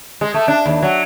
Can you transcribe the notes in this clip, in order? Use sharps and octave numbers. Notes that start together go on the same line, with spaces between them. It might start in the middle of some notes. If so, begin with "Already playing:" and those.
G#3
A3
D4
D#2
F#3